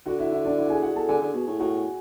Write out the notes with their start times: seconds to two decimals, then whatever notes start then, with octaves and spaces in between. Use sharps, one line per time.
0.06 D3 F#4 F#5
0.19 E4 E5
0.31 E4 E5
0.45 D4 D5
0.57 E4 E5
0.65 F#5
0.70 G#4 G#5
0.83 F#4 F#5
0.96 A4 A5
1.08 D3 G#4 G#5
1.21 D3
1.34 B2
1.47 A2
1.60 A2 F#4 F#5